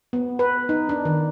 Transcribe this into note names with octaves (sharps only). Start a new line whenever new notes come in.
B3
B4
D#4
D4
D#3